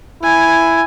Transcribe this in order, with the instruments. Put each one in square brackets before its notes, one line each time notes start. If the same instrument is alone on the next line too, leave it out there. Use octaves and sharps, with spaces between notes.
[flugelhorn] E4 [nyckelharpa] G#5